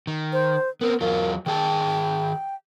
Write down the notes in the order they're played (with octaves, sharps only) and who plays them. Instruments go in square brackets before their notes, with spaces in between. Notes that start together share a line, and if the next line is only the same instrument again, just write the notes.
[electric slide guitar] D#3
[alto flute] C5
[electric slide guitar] B3 C4 [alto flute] A#4
[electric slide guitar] E2 F#3 F4 [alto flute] A#4
[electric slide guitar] D#3 G#4 A5 [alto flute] G5